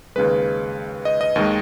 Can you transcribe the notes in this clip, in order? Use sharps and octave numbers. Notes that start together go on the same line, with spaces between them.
D#2 C#3 G#3 B4
D#5
D#5
D#2 D#3 G#3